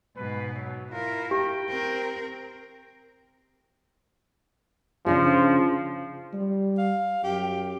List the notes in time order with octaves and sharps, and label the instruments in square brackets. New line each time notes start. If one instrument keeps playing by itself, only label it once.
[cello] G#2 B2 [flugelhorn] B4
[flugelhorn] F#3
[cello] E4 A#4 [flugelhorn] F4
[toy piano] G4 [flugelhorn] G5
[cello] C4 A#4
[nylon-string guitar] C#3 D4 G#4 [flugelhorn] F3
[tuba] G3
[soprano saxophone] F5
[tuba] F#2 [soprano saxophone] G4